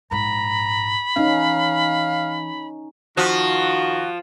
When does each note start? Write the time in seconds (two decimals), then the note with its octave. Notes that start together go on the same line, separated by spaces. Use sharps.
0.11 A#1 G#2 A#5 B5
1.16 E3 C#4 D#4 F5
3.17 D#3 F3 F#4